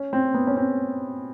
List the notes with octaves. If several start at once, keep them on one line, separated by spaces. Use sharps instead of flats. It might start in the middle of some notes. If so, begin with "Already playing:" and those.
Already playing: C#4
C4
B3
C#4
C4